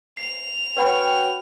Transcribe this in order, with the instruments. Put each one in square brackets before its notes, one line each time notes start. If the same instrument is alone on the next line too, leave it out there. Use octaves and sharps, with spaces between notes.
[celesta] C7 [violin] F7
[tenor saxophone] C#4 [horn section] F#4 G5 [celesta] B4 F#5 B5